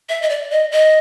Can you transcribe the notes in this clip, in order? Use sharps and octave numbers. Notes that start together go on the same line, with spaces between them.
E5
D#5
D5
D#5
D#5